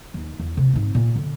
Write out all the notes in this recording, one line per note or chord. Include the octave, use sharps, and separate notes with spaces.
D#2
E2
C3
G#2 C4
A#2
D3